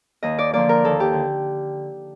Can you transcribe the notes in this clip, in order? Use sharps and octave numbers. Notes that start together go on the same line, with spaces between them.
D#2 D#5
D5
D3 F3 A#3 D5
A#4
D#2 A4
G4
D3